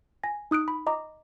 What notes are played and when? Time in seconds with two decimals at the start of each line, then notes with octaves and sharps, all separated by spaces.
0.24 G#5 A#6
0.51 D#4 D#6 F#6 D7
0.68 B5
0.87 D#5 A#5 D6